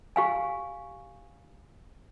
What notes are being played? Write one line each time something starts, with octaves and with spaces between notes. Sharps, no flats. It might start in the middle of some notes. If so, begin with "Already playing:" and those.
G4 F5 G#5